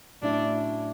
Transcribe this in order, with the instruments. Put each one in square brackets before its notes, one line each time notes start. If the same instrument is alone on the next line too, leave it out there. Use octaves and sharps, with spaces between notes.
[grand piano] A2 F#3 C#4 E4 [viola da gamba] D4